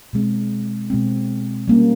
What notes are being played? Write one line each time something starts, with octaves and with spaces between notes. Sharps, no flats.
B2 G#3 C4
B2 G#3 C4
G3 A#3 C#4